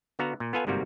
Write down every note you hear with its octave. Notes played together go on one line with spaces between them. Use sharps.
D3 B3 F#4 F5 A#5
A#2
B3 F4 A4 B4 F5 G#5
G1 G#2 C3 G3 A#3 F#4